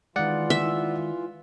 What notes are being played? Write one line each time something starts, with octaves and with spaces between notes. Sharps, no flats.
D#3 E3 G#3 F4 D5 F#5
E5